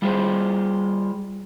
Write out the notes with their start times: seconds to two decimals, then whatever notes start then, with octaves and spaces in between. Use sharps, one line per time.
0.02 G3 F4 G4 G#4 C5